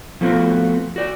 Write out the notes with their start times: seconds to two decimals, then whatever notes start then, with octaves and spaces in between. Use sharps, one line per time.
0.21 F3 A3 B3 C4 F4 F#4
0.96 F#4 D5